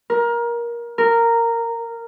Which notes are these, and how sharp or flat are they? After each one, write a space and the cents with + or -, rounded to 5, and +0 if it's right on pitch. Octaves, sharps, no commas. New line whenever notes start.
A#4 +20
A#4 -10